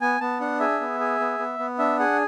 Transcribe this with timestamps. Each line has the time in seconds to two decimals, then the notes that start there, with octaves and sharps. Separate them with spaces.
0.01 B3 G#5
0.20 B3 A5
0.40 D4 F#5
0.60 G#4 E5
0.81 B3
1.00 G#4
1.20 B3
1.39 B3
1.59 B3
1.79 D4 E5
1.99 G#4 F#5